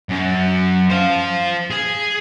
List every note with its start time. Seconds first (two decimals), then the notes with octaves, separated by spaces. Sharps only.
0.09 F#2
0.90 C5 F5
1.71 G#4